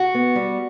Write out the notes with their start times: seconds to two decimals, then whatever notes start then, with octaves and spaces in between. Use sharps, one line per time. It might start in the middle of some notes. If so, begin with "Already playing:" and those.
Already playing: F#4
0.14 B3
0.35 G3